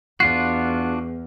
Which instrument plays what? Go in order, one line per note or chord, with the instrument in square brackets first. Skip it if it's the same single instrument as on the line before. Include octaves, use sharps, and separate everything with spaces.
[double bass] E2 [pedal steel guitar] D4 F4 F#4 [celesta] C7